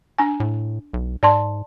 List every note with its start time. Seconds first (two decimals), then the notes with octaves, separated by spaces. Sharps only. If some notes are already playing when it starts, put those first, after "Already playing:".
0.18 D4 G#5
0.40 A2
0.93 B1
1.23 G#2 D5 A5 C6